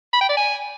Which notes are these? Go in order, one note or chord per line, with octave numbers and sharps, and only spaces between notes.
B5
G5
D5
G#5